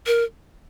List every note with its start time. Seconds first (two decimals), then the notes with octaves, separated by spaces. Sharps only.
0.07 A#4